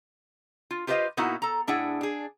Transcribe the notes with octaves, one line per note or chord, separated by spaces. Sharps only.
F4
F4 G4 B4 C5 D#5 F5
A#2 A#3 B3 D#4 E4 F#4
A4 A#5
A2 D4 E4 G#4 F#5
D4 G#4